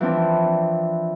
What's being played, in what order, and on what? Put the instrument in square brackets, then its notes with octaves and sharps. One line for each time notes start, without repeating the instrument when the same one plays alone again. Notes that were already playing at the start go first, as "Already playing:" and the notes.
[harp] E3 F3 C4 D4